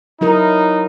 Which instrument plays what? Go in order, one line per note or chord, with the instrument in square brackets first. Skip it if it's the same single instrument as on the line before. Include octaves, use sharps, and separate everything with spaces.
[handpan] F#3 E4 A#4 [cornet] D#4